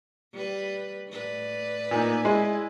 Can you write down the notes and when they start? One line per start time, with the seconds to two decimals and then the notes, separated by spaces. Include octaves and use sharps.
0.33 G3 B4
1.11 A2 B4 D5
1.91 A#2 A#3 D#4 G#5
2.25 G#3 E4